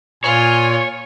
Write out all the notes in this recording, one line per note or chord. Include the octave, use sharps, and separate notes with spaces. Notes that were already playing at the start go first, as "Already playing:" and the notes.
A#2 F4 C#5 G#5